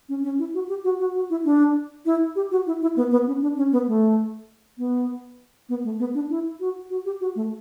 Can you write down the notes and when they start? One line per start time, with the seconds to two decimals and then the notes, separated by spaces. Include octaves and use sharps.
0.09 C#4
0.24 C#4
0.39 E4
0.54 F#4
0.69 G4
0.84 F#4
0.99 F#4
1.15 F#4
1.30 E4
1.45 D4
2.06 E4
2.36 G4
2.51 F#4
2.67 E4
2.82 E4
2.96 B3
3.11 B3
3.27 C#4
3.42 D4
3.57 C#4
3.72 B3
3.87 A3
4.78 B3
5.69 B3
5.84 A3
5.99 B3
6.14 D4
6.30 E4
6.60 F#4
6.90 F#4
7.05 G4
7.21 F#4
7.36 A3